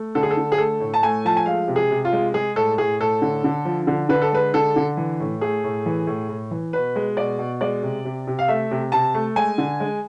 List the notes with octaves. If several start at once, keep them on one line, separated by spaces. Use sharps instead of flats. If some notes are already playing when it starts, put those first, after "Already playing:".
Already playing: A3
D3 A4
G#4
A4
D3
G#4
A3 A4
A2
A5
A3 G#5
F3 A5
G#5
G#3 F5
C3
G#4
C3
F4
G#3
G#3 G#4
A2 A4
A2 G#4
A2 A4
D3
D3
F3
D3
D3 B4
A4
G#3 B4
D3 A4
D3
E3
A2
A3 G#4
A2
E3
A2
A2
E3
B2 B4
G#3
B2 D5
B2
G#3 D5
C3
C3
C3
F5
A3 E5
C3
C3 A5
A3
G#3 G#5
D3
G#3